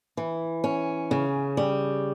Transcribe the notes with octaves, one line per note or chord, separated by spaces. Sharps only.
E3
C#4
C#3
G3